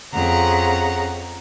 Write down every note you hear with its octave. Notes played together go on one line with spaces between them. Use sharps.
F2 C#4 G#4 F#5 A#5